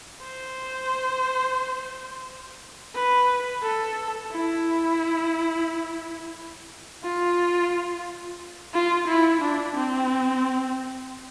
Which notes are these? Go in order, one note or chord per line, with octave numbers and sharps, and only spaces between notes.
C5
B4
A4
E4
F4
F4
E4
D4
C4